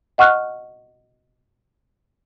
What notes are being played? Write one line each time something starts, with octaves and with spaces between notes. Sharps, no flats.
D#5 F#5 C#6 F6 F#6